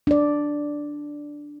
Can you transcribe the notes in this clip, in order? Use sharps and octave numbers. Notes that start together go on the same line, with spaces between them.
D4 D5